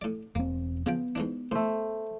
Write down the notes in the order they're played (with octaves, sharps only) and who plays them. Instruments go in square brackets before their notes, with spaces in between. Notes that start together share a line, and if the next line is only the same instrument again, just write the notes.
[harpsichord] A2 D5
[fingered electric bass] E1 C4 [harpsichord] A#3
[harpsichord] C#3 F3 G5 [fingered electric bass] B3
[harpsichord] G#2 E3 D4
[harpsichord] A2 [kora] A3 C5